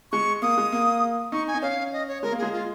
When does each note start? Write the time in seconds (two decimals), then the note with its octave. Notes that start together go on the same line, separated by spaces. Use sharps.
0.12 G#3 C#6
0.42 A#3 D#6
0.58 G#3
0.72 A#3
1.32 D#4 C#6
1.48 G#5
1.55 D#4
1.62 C#4 F5
1.93 D#5
2.08 C#5
2.23 G#3 A#4
2.32 A#3
2.38 G#3 G#4
2.53 F4